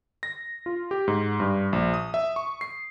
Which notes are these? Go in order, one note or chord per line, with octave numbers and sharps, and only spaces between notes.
A#6
F4
G4
G#2
G2
A#1
D#6
E5
C#6
C7